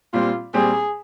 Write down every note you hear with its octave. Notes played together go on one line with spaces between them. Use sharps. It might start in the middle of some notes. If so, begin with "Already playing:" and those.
A#2 G3 C4 F4
A#2 G3 C4 G#4